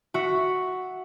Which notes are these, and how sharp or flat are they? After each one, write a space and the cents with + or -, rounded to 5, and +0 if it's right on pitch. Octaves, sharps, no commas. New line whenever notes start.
F#4 +0 E5 +0